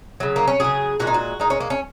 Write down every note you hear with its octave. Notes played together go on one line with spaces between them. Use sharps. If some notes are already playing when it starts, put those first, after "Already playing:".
C#3 F#3
A#3
C#4
C#3 F#3 G#4
A#2 G#3 F#4
D#4
F#4
A#2 G#3 D#4
C#4
A#3
C#4